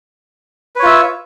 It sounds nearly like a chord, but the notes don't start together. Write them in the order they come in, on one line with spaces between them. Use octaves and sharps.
B4 C#5 F4 E5